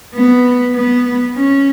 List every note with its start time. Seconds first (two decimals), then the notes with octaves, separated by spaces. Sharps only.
0.14 B3
0.75 B3
1.35 C#4